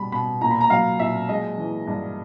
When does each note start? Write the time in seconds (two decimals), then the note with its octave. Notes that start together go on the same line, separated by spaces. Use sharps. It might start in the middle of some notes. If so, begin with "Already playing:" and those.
Already playing: B2 G3 B5
0.12 B2 B5
0.41 A#2 A#5
0.51 B5
0.61 A#5
0.70 F#3 F5
1.00 A#2 E5
1.29 G#3 D#5
1.58 E3
1.87 G2